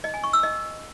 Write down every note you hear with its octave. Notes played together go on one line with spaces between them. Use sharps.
D#5
G#5
C#6
E6
D#5